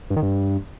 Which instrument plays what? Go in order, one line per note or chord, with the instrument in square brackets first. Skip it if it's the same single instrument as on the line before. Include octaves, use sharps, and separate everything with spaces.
[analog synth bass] G2
D#3
G2